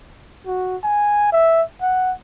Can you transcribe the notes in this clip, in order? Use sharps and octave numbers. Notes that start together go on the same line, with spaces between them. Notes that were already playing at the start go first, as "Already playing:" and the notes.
F#4
G#5
E5
F#5